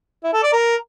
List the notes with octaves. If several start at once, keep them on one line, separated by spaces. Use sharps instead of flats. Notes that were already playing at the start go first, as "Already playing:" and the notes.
E4
A4
D5
A#4